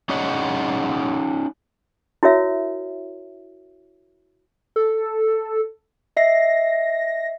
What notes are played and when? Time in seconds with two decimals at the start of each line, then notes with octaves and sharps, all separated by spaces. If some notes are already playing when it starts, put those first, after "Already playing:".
0.09 C#4 D#4 G#4 D5 D#5 F#5
2.23 E4 F#4 A#4 C#5 E5
4.76 A4
6.17 D#5 E5 A#6 C7